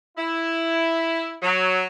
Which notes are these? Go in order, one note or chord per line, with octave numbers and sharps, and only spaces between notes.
E4
F#3